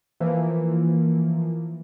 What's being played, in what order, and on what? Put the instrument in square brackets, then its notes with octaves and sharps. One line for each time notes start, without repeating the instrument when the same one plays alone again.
[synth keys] E3 F3 A#3